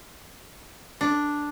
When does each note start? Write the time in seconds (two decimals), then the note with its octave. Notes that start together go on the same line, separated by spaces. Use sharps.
1.01 D4